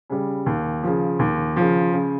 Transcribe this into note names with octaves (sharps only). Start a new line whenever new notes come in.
C#3 G3
D#2
C#3 F3
D#2
C#3 F3
C#3